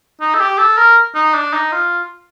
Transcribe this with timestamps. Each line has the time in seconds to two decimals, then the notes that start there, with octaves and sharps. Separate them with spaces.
0.21 D#4
0.35 A4
0.40 G4
0.58 A4
0.78 A#4
1.15 D#4
1.34 D4
1.53 D#4
1.72 F4